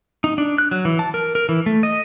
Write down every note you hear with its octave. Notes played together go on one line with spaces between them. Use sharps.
D#4
D4
F#6
F#3
E3
A5
A#4
A#4
E3
A3
D#5